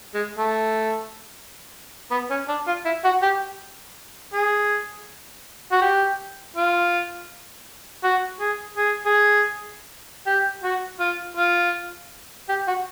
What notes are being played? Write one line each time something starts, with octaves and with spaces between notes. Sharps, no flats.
G#3
A3
B3
C#4
D4
F4
E4
F#4
G4
G#4
F#4
G4
F4
F#4
G#4
G#4
G#4
G4
F#4
F4
F4
G4
F#4